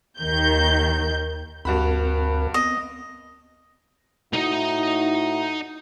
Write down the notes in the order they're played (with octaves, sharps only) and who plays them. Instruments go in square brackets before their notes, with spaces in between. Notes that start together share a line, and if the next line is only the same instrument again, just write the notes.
[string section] D#2 D#3 G6
[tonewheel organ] D2 C4 A#4 [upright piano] G2 F#4 B5
[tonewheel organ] B3 C4 [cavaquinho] D#5
[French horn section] A2 E4 F#4 [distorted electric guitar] D#4 D#5